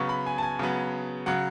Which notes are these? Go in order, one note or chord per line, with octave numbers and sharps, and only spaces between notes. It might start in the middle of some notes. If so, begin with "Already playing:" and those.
Already playing: C#3 F#3 B3 C#6
B5
G#5
A5
G#5
C#3 F#3 B3
C#3 F#3 F#5